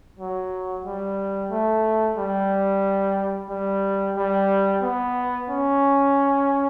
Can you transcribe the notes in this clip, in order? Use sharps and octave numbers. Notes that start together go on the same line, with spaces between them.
F#3
G3
A3
G3
G3
G3
B3
C#4